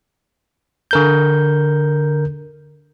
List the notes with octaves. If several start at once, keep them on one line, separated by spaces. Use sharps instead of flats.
D3 A#4 G6